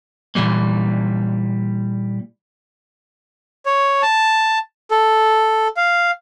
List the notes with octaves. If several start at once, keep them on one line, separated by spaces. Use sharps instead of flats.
A#2 E3 G3 A#3
C#5
A5
A4
F5